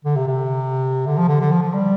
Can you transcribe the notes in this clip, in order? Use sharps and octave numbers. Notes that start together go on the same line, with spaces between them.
D3
C3
C3
D3
F3
D3
D3
F3
F3
G3